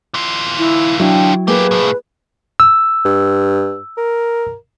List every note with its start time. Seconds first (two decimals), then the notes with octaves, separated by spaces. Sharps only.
0.14 E3 F4
0.58 E4
1.00 F#3 D4 E4 G5
1.48 A3 A#3 G4 G#4 B4
1.71 C2 A2
2.60 E6
3.05 G2
3.97 A#4